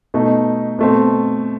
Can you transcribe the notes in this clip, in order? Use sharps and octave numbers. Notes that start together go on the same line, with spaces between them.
B2 A3 D#4
B2 A3 C4